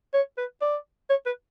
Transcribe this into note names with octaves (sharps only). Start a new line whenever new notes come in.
C#5
B4
D5
C#5
B4